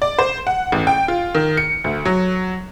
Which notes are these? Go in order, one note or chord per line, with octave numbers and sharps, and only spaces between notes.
D5
C5
F#5
A1
G5
F4
D#3
C#7
D2
F#3